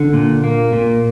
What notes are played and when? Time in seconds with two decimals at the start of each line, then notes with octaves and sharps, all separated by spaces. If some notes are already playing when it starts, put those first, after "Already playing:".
Already playing: D3
0.13 A#2
0.44 A#3
0.73 A#2